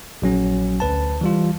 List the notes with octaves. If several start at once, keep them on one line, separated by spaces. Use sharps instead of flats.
A#1 F#3 C#4
D2 B4 A5
E3 G3 F4